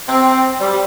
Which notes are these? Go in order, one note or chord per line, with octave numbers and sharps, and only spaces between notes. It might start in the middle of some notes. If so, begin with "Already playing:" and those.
C4
G3